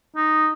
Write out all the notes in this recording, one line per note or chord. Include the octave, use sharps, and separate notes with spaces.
D#4